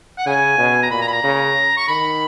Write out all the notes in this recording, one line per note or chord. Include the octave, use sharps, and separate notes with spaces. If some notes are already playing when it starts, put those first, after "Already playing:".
F#5
C#3 G#5
B2
A#5
A#2 B5
A#5
B5
A#5
C#3
C#6
D#3 B5